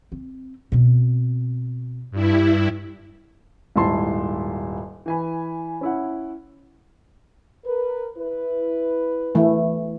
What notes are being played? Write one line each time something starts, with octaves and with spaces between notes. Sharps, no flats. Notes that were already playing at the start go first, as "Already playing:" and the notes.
C4
B2 C4
G2 E4
D#1 G#2 E4 A5 C6 C7
E3 G#5 B5
C#4 E4 F#5
A#4 B4
E4 B4
E3 A3